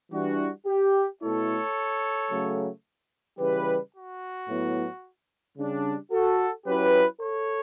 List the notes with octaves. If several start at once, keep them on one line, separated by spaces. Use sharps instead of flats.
E3 G3 D4 F#4
G4
B2 A3 E4 A4 C#5
C#3 F#3 A3
C#3 E3 G3 G4 B4
F#4
A2 F#3 B3 E4
C#3 G3 D4
F#4 A4
F#3 C#4 E4 G4 B4
A4 C#5